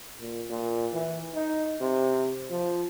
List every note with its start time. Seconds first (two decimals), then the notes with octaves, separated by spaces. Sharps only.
0.20 A#2
0.50 A#2
0.93 E3
1.35 D#4
1.81 C3
2.50 F3